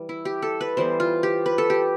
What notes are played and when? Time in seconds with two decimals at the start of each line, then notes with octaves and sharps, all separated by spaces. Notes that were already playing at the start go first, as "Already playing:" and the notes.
Already playing: E3 G3
0.09 E4
0.25 G4
0.42 A4
0.61 B4
0.77 E3 G3 B3 C5
1.00 F4
1.23 G4
1.46 B4
1.58 A4
1.70 G4